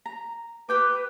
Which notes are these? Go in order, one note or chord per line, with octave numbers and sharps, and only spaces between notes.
A#5
G4 B4 G5 D6